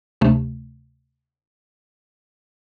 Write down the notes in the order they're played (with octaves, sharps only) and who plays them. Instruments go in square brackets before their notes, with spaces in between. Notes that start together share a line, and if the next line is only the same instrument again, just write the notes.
[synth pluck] D2 C3 A3